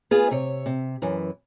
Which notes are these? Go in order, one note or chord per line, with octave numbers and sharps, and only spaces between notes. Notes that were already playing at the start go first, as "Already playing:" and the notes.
B3 F4 G#4
C3 C#5
C3
F#2 E3